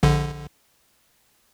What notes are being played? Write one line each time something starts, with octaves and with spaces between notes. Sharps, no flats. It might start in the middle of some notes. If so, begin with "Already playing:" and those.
A#1 D3